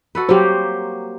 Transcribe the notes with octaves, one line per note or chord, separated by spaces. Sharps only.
F#4 A4 B4
F#3 A#3 G4 C5